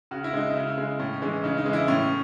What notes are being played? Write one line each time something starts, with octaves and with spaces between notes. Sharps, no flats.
C#3 F#4
E4
G#3 D#4
E4
C#3
G#3
A2 C#4
E3 G#3
C#3 D#4
D#4
E3 G#3
E4
A2 C#4